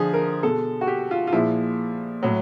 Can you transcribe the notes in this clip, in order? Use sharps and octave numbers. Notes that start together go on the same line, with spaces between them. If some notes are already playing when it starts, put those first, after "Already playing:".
Already playing: D3 F3 G#4
A#4
B2 G#3 A4
F#4
G4
F4
F4
A#2 F3 G#3 E4
A2 F#3